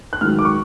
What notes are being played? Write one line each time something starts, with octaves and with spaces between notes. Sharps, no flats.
F#6
G#2 D#3 F#3 F6
D6
C#6